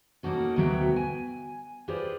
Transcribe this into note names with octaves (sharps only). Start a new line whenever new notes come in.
A#3 C#4 D#4 F#4 A4
D2 B2 F#3 A4 E5 G5
G#5
F4 G4 G#4 B4 C5 D5